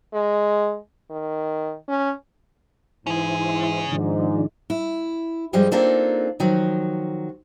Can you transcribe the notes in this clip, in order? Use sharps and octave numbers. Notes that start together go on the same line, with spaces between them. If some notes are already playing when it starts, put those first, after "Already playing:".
G#3
D#3
C#4
G#2 E3 C#4 E4 G#4 C5
G#2 D#3 F3 D4
E4
G2 F3 G3 G#3
A#3 C4 D4 D#4 F4 A4
D#3 F3 F#3 F#4